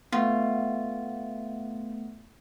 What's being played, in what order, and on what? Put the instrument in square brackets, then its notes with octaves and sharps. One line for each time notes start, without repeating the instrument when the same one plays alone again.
[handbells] A3 B3 [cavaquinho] F4